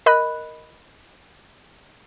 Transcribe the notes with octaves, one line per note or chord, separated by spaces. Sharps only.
A#4 D#5 B5 F#6